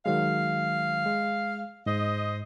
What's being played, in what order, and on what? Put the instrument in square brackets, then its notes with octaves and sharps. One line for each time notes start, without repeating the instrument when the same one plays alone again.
[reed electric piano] D#3 F#3 G#3 [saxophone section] F5
[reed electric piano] G#3
[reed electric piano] G#2 [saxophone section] C5 D#5